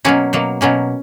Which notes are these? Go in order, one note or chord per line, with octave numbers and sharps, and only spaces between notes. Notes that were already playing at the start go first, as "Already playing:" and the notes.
B2 F#3 A#3 C#4
B2 F#3 A#3
B2 F#3 A#3 C#4